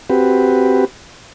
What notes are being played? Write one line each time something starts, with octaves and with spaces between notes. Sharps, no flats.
C4 F#4 G4 B4